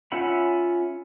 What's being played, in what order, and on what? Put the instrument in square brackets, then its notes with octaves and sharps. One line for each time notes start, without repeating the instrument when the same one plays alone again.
[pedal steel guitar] C#4 F4 E5 F#5 B5